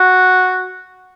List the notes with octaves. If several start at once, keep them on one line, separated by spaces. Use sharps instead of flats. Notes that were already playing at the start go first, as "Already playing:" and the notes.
Already playing: F#4